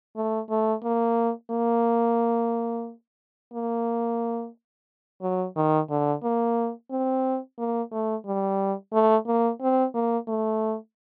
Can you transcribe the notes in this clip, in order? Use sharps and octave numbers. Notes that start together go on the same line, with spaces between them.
A3
A3
A#3
A#3
A#3
F#3
D#3
D3
A#3
C4
A#3
A3
G3
A3
A#3
C4
A#3
A3